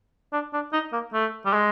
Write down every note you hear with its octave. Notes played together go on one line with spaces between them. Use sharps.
D4
D4
D#4
A#3
A3
G3
G#3